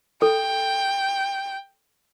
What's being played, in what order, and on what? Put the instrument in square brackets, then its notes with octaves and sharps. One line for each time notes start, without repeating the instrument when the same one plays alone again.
[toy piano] A4 [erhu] G5